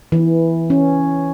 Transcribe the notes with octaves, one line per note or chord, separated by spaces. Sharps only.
E3
C#4